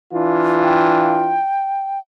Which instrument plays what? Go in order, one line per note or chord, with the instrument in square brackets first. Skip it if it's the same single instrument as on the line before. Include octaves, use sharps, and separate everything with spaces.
[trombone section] E3 D4 F4
[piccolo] G5